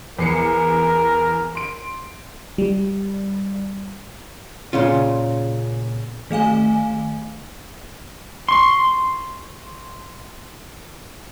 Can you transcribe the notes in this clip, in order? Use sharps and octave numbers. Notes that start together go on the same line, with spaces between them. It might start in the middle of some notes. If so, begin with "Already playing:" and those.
E2 A#4 C7 C#7
C6 D7
G3
A#2 C#3 C#4 F4
D#3 A3 F5 G#5
C6 C#6